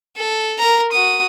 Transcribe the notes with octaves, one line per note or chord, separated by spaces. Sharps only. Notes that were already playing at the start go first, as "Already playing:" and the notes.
A4
A#4 A#5
F#4 D#6